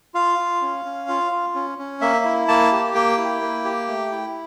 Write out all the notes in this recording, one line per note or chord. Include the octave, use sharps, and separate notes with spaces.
F4 F5
F4
C#4
C#4
F4
F4
C#4
C#4
A#3 E5
E4
A#3 A5
G4
A#3 G5
E4
A#3
G4
A3
E4